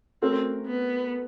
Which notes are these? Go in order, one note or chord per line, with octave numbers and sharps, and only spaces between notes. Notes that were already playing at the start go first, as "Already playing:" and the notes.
A3 C4 C#4 F#4 A#4
B3